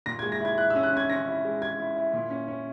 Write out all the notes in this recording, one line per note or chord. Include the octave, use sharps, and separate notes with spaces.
A#2 A#6
G#3 G#6
A#6
E4
G#6
E4 F#6
E6
C#4
F#6
C#4 G#6
C#4 A#6
E4
G#3
G#3 G#6
E4
E4
A#2
C#4
C#4